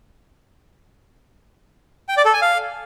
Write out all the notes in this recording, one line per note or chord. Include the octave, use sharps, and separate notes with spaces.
G5
D5
A4
G#5
F5